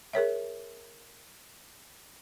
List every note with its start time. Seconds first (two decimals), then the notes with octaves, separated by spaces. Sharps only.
0.13 G#4 A#4 C#5 E5